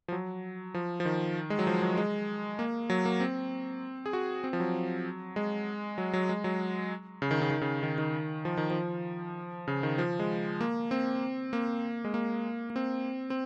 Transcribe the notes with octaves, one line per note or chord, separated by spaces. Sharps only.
F3
F#3
F3
F3
D#3
G#3
F#3
F3
F#3
G#3
A#3
F#3
A#3
C4
G#4
F#4
C4
F3
F#3
G#3
F#3
F#3
G#3
F#3
C#3
D#3
C#3
D#3
C#3
D#3
D#3
F3
D#3
F3
C#3
D#3
F3
G#3
A#3
C4
A#3
G#3
A#3
A#3
C4
C4